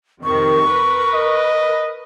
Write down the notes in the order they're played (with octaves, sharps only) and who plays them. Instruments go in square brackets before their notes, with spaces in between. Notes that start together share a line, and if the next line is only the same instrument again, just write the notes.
[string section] F2 C3 D#3 [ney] C#6
[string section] A#4 B4
[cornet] D#5